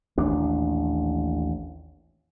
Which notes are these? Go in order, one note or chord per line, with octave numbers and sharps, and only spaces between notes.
A1 D#2 A#2 D4